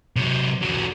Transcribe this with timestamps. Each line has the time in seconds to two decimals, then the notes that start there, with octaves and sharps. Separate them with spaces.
0.16 C3 F#3
0.62 E2 F#3